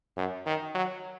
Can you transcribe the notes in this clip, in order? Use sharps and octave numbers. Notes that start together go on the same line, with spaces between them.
F#2
D#3
F#3